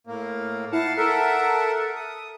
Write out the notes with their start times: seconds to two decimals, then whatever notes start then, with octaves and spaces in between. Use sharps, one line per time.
0.07 A2 A#3
0.72 E4 F5 F#5 A5
0.97 A4 A#4 E5 F#5
1.96 D#6